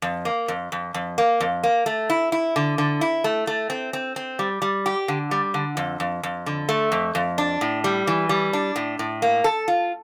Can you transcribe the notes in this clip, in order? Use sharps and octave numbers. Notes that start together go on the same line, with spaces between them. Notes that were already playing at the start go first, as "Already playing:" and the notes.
F2
A#3
F2
F2
F2
A#3
F2
A#3
A3
E4
E4
D3
D3
E4
A3
A3
C4
C4
C4
G3
G3
G4
D3
G3
D3
F2
F2
F2
D3
A3
F2
F2
D4
A2
G3
E3
G3
D4
A2
A2
A#3
A4
F4